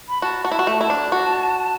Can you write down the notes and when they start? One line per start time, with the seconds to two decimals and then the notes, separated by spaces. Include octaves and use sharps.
0.09 B5
0.22 F#4 A5
0.45 F#4 F#5
0.52 E4 A5
0.59 F#4
0.67 A3
0.81 E4 A5
0.90 D4
1.12 F#4